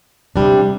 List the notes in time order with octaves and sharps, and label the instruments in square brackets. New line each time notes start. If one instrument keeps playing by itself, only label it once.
[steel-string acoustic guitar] C3 G3 D4